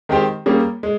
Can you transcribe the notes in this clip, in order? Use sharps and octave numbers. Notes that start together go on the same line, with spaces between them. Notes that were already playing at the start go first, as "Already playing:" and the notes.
D#3 G#3 C4 G4 C5
G3 A#3 C#4 G#4
G#3